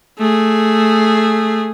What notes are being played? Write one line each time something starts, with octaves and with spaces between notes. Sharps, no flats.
A3 G#4